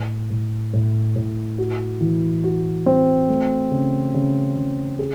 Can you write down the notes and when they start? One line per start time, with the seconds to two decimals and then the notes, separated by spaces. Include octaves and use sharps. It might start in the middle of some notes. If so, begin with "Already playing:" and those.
Already playing: A2
0.30 A2
0.73 A2
1.16 A2
1.58 F#4
2.01 E3
2.44 F#4
2.86 C4
3.29 A3
3.71 C#3
4.14 C#3
4.56 C#3
4.99 G#4